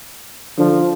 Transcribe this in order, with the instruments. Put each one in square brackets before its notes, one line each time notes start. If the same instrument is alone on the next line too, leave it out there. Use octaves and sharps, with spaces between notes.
[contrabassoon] D3 [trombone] F3